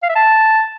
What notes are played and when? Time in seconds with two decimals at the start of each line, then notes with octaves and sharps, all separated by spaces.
0.03 F5
0.09 E5
0.15 A5